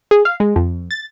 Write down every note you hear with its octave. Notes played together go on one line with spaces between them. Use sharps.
G#4
F5
G#3
F2
A6